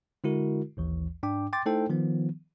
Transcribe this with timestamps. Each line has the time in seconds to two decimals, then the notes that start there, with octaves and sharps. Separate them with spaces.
0.24 D3 G#3 E4 F#4 A#4
0.77 A1 D#2 E3
1.23 G#2 D4 G5 D6
1.53 G5 C6 D6 A6
1.66 A3 D#4 E4 A4 C5 G5
1.90 D#3 F3 B3